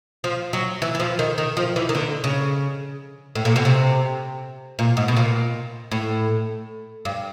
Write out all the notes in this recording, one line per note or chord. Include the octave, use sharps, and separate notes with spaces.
F3
F#3
E3
E3
F3
D#3
D#3
F3
E3
D#3
D3
C#3
A2
A#2
B2
C3
A#2
G#2
B2
A#2
A2
G2